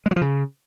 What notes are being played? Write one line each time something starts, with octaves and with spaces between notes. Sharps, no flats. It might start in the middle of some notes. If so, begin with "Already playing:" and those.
G#3
F#3
F3
C#3